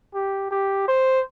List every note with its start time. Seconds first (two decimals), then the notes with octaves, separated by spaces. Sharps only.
0.14 G4
0.51 G4
0.88 C5